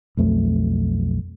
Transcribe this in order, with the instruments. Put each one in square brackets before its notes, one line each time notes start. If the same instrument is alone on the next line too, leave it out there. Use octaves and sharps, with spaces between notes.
[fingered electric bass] B1 F2 A3